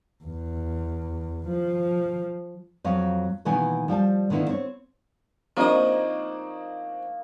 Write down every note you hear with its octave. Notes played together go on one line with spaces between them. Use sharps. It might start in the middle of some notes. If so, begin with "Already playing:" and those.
E2
F3
F2 F3 F#3 F5
B2 D#3 E3 A#3 B3 G#5
F3 G3 G5 A5
D3 D#3 A#3 B3 E4
C4 C#5
F3 A#3 C4 D4 D#4 D#5 C#6 D#6